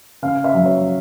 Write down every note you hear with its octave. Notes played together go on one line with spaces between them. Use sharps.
C#3 F5
E5
F#3
C#5